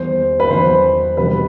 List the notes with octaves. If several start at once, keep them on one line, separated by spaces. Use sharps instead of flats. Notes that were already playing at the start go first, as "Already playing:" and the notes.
Already playing: E2 D#3 G3 C5
B4
E2 D#3 F#3 C5
E1 E2 C3 D#3 G3 B4